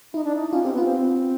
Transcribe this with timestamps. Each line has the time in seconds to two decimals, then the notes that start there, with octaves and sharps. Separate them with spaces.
0.14 D#4 E4
0.24 D4
0.35 D#4
0.52 C#4 F4
0.63 C4 G4
0.73 B3 F4
0.84 C4